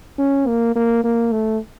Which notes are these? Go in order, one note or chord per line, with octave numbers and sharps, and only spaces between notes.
C#4
A#3
A#3
A#3
A3